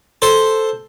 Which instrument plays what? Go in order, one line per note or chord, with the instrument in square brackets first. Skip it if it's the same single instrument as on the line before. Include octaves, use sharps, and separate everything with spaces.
[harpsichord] A4 C5